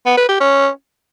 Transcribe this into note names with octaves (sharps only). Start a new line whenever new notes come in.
B3
B4
G4
C#4